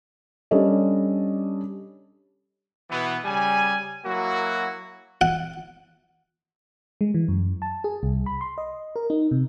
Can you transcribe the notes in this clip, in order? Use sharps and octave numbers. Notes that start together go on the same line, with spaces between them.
G3 C#4 D4 A4 C#5 D#5
B2 E3 B3
C#3 G3 G#5
F#3 A#3 E4 F#4
F#5
G#3
E3
F#2
A5
G#4
C2
B5
C6
D#5
A#4
D#4
C3